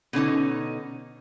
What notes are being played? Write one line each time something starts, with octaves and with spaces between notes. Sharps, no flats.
B2 D3 C#4 D#4